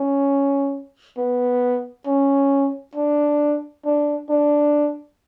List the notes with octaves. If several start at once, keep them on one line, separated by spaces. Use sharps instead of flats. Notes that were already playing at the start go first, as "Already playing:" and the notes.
Already playing: C#4
B3
C#4
D4
D4
D4